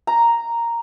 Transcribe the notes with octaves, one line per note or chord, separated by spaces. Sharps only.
A#5